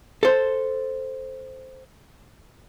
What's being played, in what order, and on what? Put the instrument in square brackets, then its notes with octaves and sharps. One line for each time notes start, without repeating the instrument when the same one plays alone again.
[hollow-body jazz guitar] A4 C5